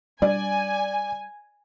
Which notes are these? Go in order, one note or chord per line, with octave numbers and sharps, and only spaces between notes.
G3 D4 D5 G#5